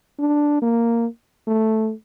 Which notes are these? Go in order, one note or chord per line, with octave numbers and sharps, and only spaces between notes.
D4
A#3
A3